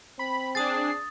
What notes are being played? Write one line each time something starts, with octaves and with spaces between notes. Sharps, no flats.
C4 B5
D4 G#4 D#6 A6 C7